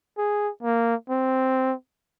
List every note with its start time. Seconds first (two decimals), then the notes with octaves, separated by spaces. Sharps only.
0.18 G#4
0.63 A#3
1.09 C4